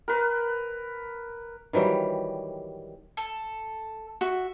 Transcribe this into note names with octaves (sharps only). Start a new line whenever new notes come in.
A#4 B4
D#3 E3 F#3 G3
A4
F#4 E5